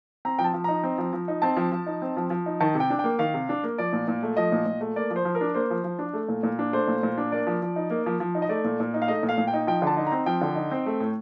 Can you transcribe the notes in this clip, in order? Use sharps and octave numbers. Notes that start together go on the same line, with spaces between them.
C4 A#5
F3 G5
A5
F3
D#4 A#5
C4
F3
F3
D#4
C4 A5
F3
F3
D#4
C4
F3
F3
D#4
D#3 A5
C3
G5
D4
A#3 G5
D#3 F5
C3
D4
A#3
F3 D5
A#2
A#2
A3
F3 D#5
A#2
A#2
A3
A#3 D5
F3
C5
F3
A#4
D4
A#3 C5
F3
F3
D4
A3
A#2
A#2
D4
A3 C5
A#2
A#2
D4
A#3 D5
F3
F3
D#4
A#3
F3
F3
D#4
D#5
A3 D5
A#2
A#2
D#4
F5
A3 D#5
A#2
F5
A#2
G5
D#4
F3 G5
D3 A5
D#4
A#5
C4
F3 G5
D3
D#4
C4
A3
A2